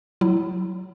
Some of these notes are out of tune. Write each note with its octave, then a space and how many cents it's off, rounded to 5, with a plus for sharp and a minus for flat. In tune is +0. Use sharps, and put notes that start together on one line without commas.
F#3 +0 E4 +0